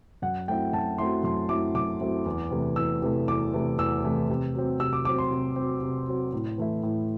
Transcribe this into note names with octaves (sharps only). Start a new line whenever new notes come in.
F#2 F#5
F#3 A3 C4 E4 G5
F#2 A5
F#3 A3 C4 E4 C6
F#2 C6
F#3 A3 C4 E4 D6
F#2 D6
F#3 A3 C4 E4
E2
C3 E3 A3
E2 E6
C3 E3 A3
E2 D6
C3 E3 A3
E2 E6
C3 E3 A3
C3
F#3 C4
C3 E6
D6
F#3 C4 D6
C6
C3
F#3 C4
C3
F#3 C4
A2
E3 A3 E4
A2